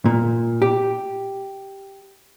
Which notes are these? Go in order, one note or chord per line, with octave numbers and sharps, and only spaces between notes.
A#2
G4